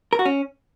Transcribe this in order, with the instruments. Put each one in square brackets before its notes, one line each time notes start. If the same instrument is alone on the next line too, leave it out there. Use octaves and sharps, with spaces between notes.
[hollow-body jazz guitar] A#4
F#4
C#4